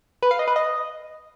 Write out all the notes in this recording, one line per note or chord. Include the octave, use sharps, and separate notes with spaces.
B4
F5
D#5
B4
D#5